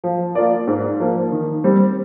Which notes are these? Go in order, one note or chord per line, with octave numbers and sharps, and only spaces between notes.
F3
A#3 F4 A#4 D5
G#2
F3 A#3
D#3
G3 C4